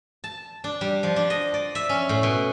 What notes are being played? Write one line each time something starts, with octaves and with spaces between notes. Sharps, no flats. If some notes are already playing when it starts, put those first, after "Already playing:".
A5
D4
G3
F3
D4
D#5
D5
E5
C#4
A2
B2